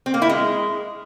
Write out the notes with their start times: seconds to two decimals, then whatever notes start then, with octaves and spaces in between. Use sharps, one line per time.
0.06 C4
0.14 A#3
0.22 E4
0.29 G#3